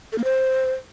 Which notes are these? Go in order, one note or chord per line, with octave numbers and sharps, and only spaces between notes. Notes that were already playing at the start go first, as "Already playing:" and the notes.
A4
A#3
C5